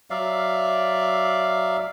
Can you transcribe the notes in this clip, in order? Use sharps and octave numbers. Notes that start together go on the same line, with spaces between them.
F#3 D5 E5 F5